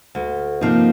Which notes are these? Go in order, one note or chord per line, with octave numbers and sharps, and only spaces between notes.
D2
C3 F3 A#3 D#4